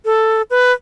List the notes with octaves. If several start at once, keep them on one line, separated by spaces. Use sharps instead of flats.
A4
B4